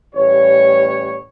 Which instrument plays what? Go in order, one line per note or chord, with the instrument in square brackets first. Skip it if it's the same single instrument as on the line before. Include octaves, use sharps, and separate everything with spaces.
[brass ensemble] A1 A2 G3 B4 C#5